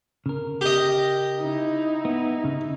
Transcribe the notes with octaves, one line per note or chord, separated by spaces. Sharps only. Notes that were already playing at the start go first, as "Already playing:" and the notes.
C#3 A#4
G4 D#5
D#4 E4
B3
C#3